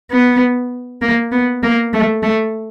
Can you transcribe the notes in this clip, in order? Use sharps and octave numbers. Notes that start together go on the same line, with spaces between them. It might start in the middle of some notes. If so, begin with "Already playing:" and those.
B3
A#3
B3
A#3
A3
A3